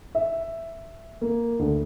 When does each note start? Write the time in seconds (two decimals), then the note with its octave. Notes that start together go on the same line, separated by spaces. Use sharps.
0.15 E5
1.21 A#3
1.59 D2